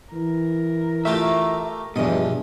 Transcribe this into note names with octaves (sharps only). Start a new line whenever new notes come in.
E3 A#4
A3 F4 G4 E5
E2 G2 B2 F3 D#5